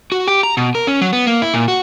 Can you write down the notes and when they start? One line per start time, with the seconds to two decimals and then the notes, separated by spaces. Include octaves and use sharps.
0.12 F#4
0.28 G4
0.43 A#5
0.57 B2
0.75 A#4
0.87 C#4
1.01 F#3
1.13 B3
1.26 A#3
1.42 E4
1.54 A#2
1.68 F#4